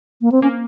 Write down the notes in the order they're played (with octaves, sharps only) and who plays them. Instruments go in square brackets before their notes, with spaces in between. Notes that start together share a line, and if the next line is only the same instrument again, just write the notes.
[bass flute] A#3
C4
[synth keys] A#3 [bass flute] C#4